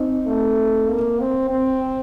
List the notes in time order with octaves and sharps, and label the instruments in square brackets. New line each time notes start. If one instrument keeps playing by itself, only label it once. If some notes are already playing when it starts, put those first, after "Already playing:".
Already playing: [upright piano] C4 D#4
[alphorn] A3
A#3
C4
C4